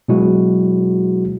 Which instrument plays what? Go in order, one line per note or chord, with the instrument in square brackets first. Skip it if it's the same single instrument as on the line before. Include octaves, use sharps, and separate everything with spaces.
[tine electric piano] B2 F#3 G#3 E4 F#4